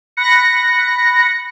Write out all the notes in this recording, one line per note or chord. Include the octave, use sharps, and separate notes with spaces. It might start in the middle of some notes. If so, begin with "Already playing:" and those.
B5 F#6 A#6 C#7